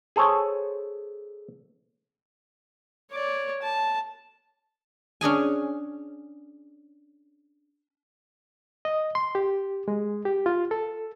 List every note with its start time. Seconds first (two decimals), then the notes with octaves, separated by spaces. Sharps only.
0.16 G#4 A4 C5 C#5
3.12 C#5 D5
3.62 A5
5.21 C#4 D4 G#4 G#5
8.85 D#5
9.15 C6
9.35 G4
9.88 G#3
10.25 G4
10.46 F4
10.71 A4